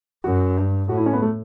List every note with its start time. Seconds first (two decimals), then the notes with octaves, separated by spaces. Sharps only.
0.24 F#2 F#4
0.57 G2
0.89 A2 F#4
0.97 E4
1.06 C#4
1.13 B3
1.22 A3